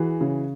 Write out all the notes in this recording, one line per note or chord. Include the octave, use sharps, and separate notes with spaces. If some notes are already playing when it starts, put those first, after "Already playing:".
Already playing: E3 F#4 G#4
C#3